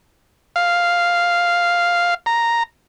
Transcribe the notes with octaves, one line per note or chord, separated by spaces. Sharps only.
F5
A#5